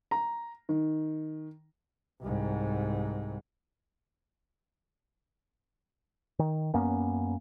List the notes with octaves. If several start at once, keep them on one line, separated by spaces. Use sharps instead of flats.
A#5
D#3
C2 G#2
D#3
F#2 A#3 B3 C#4